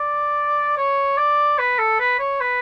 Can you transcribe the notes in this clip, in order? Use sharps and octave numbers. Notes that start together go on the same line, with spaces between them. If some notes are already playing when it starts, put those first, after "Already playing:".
Already playing: D5
C#5
D5
B4
A4
B4
C#5
B4